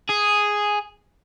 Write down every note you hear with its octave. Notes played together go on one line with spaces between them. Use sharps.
G#4